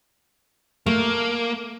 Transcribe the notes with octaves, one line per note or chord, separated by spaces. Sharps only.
A3 A#3